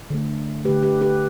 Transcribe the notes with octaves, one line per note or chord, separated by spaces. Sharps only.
D3 A3
D3 A3 G4 B4
G4 B4
G4 B4